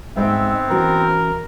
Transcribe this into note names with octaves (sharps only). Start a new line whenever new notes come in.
G#2 B3 C4 E5 G5
E3 C#4 F#4 A#4